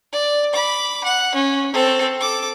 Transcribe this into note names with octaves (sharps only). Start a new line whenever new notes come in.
D5
B5 D6
F#5
C#4
C4 A4
A4 D6